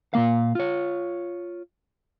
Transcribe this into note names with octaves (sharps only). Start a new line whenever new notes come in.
A#2 D#3 A#3 F5
F4 C#5